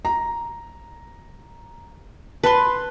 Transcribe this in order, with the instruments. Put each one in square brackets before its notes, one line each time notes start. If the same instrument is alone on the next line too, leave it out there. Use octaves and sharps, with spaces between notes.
[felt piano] A#5
[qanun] B4 C6 [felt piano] A5 B5